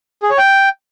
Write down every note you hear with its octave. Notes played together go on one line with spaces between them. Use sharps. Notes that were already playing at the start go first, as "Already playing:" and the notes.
G#4
C#5
G5